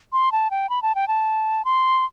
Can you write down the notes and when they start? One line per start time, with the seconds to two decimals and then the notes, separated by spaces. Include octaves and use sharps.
0.13 C6
0.32 A5
0.51 G5
0.70 B5
0.82 A5
0.95 G5
1.08 A5
1.65 C6